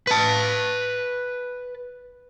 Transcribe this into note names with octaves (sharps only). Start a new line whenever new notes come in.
B4 A5